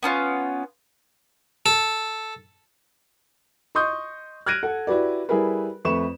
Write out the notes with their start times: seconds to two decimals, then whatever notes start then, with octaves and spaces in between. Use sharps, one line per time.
0.03 B3 C#4 D4 F4
1.66 A4
3.75 D#5 C6 C#6 D#6 G6
4.46 F6 F#6 G#6 A#6 D7 D#7
4.63 A4 F#5
4.87 E4 F#4 G4 B4 D5
5.29 G3 E4 G#4 A#4 B4
5.85 F2 A3 B4 C#6 E7